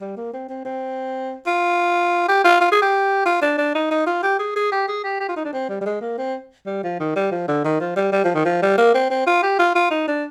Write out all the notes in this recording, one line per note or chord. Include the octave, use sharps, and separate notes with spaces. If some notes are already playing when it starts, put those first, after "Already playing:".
G3
A#3
C4
C4
C4
F4
G4
F4
F4
G#4
G4
F4
D4
D4
D#4
D#4
F4
G4
G#4
G#4
G4
G#4
G4
G4
F4
D#4
D4
C4
G3
G3
G#3
A#3
C4
G3
F3
D#3
G3
F3
D3
D#3
F3
G3
G3
F3
D#3
F3
G3
A#3
C4
C4
F4
G4
F4
F4
D#4
D4